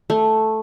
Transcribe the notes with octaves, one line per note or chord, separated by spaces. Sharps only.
A3